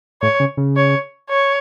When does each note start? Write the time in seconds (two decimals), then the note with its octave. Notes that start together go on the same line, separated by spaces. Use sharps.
0.22 A2 C#5
0.40 C#3
0.57 C#3
0.76 C#5
1.29 C#5